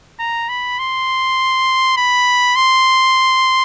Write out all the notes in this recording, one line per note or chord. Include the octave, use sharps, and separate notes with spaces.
A#5
B5
C6
B5
C6